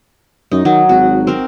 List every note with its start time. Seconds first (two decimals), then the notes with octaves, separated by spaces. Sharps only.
0.52 F#2 D#4
0.65 D#3 F#3
0.89 G#1 F#4
1.27 C4 A#4